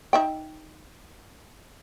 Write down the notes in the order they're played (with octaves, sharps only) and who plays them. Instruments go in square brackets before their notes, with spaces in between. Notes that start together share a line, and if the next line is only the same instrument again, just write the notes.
[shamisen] D#4 E5 G5